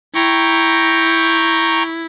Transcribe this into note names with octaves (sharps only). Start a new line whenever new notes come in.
E4 G5 A#5 C#6